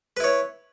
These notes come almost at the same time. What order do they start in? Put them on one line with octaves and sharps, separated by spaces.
B4 E4 C#5